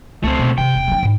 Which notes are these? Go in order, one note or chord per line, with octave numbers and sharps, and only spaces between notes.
C#2 A3 C4
B2
G2 C3 G5
E1
F#3 D4
G#2